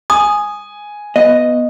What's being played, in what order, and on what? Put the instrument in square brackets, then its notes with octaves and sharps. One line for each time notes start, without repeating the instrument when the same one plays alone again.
[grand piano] G#5 [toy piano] D#6
[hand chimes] B3 [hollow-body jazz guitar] D#5